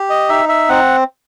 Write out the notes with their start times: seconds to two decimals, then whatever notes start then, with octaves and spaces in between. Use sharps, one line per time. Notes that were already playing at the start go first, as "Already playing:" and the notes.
Already playing: G4
0.10 D#5
0.29 D#4 E5
0.49 E5
0.69 C4 F#5